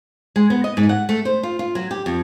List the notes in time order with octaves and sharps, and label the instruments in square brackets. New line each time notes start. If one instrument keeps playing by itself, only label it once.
[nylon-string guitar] G#3
B3
D#5
G#2
F#5
A3
C5
F4
F4
F#3
G4
F2